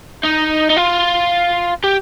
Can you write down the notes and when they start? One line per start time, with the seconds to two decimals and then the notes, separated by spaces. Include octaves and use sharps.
0.23 D#4
0.70 D#4
0.77 F4
1.84 G4